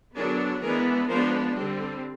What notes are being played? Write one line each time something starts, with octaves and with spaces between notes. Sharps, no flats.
D3 F#3 B3 D4 G#4 A#4
E3 G#3 B3 D4 G#4 A#4
F3 G#3 B3 D4 A#4 C5
D3 G3 C4